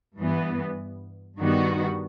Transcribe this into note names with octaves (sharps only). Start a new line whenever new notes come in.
G2 E3 B3
G2 D#3 G3 B3 F#4